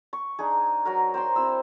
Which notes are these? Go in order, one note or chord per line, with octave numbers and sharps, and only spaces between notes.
C#6
D4 D#4 G#4
F#3 F#4 A#4
C5 G5 A#5 C6
C4 E4 E6